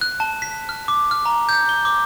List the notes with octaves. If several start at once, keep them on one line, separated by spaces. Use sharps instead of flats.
F#6
A5
B6
F6
D6
F6
A#5
G6
G7
D6